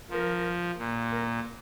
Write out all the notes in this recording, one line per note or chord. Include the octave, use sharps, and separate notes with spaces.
F3 A#4
A#2
A#4